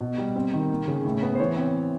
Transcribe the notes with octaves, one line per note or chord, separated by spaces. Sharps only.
B2
G3
C4
D#3
A#3
C#3
A2
B3
C5
E3 C#5
C4